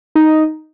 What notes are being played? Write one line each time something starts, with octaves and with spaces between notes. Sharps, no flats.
D#4